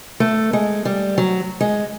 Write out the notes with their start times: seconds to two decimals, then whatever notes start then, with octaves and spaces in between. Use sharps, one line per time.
0.20 A3
0.53 G#3
0.85 G3
1.18 F#3
1.61 G#3